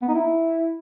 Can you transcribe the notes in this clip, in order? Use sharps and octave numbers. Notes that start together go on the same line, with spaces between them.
B3
D#4
E4